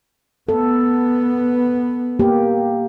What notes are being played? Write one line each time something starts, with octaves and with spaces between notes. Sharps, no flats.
B3 A4
A#3 G4